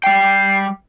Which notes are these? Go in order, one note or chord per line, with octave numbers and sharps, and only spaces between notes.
G3 G5 C7